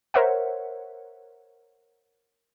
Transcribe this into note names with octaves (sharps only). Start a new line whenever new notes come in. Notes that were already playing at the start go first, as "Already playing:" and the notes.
A#4 C5 C#5 E5 F#5